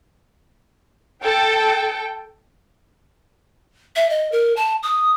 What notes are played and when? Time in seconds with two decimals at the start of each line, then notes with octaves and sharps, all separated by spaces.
1.23 A4 G5
3.96 E5
4.10 D#5
4.32 A#4
4.57 A5
4.83 D#6